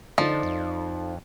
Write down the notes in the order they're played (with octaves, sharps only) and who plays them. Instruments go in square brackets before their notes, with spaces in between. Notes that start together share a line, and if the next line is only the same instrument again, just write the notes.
[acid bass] D3 [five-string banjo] F3 [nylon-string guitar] D#4 A4 D5
[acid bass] F2